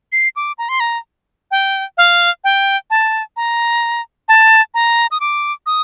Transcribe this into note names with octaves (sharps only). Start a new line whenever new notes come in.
C7
D6
A#5
C6
A#5
G5
F5
G5
A5
A#5
A5
A#5
D#6
D6
D#6